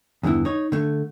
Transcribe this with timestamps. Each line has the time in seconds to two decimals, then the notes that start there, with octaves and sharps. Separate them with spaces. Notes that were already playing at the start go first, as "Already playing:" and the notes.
0.23 E2 G2 D3 B3 E4
0.45 D#4 C#5
0.72 D3 A3